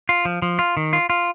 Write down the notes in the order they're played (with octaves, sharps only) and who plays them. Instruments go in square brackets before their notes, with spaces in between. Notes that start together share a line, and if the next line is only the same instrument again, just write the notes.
[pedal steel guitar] F4
F3
F3
F4
D#3
F4
F4